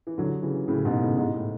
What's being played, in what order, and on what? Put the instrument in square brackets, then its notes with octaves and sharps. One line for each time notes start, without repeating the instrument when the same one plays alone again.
[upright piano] E3
D3 F#3
C#3 E3
A2 C#3
G#2 B2
A2 C#3
G#2 B2
A2